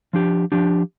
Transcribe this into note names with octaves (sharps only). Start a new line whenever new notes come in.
F3 D4 G4
F3 D4 G4